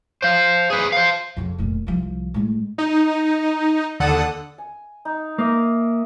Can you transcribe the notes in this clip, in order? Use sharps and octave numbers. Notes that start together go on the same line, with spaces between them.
C5 F5
G#4 B4
C5 F5
F2 C#3
F1 A#2
C2 F3
A2 G#3
D#4
D#2 D3 A4 F#5 D#6
G#5
D#4
A#3 E5 D#6